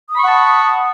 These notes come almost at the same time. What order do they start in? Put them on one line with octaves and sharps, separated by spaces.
D#6 B5 C#6 F#5 A5